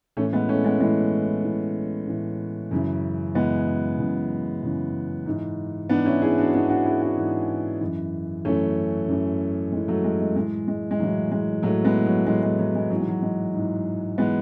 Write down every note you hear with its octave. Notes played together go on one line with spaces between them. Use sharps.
A2 E3 A3 C#4
G#3 B3
A3 C#4
G#3 B3
A2 E3 G#3 B3
A2 E3
A2 E3
F#2 C#3 E3
F#2 C#3 E3 G#3 B3
F#2 C#3 E3
F#2 C#3 E3
G#2 E3
G#2 E3 B3 D4
C#4 E4
E4 G#4
D4 F#4
G#2 E3 B3 D4
D4 F#4
E4 G#4
D4 F#4
G#2 E3
F#2 E3
F#2 E3 A3 C#4
F#2 E3
F#2 E3 G#3
F#3 A3
G#3
G#3
A2 E3 G#3
G#3
G#3
A2 E3 F#3
G#3
A2 E3 F#3 A3
G#3 B3
F#3
A2 E3 G#3
G#3
F#3
G#3
G#2 E3 F#3
G#3
F#3
G#3
G#2 E3
E3 G#3 B3